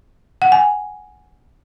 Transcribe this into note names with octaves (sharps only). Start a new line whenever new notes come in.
F#5
G#5